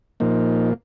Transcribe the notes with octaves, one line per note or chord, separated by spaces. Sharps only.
A#2 F3 A#3 D#4